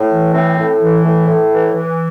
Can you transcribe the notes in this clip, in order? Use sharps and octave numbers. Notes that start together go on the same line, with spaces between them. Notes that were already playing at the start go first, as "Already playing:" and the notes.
Already playing: A2
E3
A2 C4
A2
E3
A2
A2
E3
E3